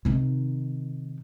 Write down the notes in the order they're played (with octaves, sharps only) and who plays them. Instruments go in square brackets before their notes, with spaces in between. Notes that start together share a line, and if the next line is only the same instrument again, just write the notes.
[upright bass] C3 D#3